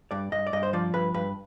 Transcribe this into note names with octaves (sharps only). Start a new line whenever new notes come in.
G2 D5
G2 D#5
D5
G2 D#5
C5
F3 D5
G2 B4
G2 B4